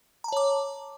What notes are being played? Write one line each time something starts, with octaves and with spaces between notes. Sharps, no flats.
C#5 A5 A#5 D6